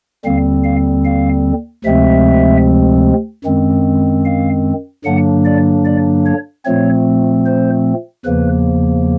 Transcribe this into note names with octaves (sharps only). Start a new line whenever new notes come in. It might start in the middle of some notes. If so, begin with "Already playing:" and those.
D#2 D3 G3 C4 F5
F5
F5
D2 C3 F3 G#3 C4 E5
F#2 D#3 G#3 C4
F5
G2 D3 F#3 A#3 D4 F#5
D5
D5
C#5
A#2 F3 A3 C4 C#5
C5
E2 C#3 F3 A#3 B4